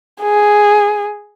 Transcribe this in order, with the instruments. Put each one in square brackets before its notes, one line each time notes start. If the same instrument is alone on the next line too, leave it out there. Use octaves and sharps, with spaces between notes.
[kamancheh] G#4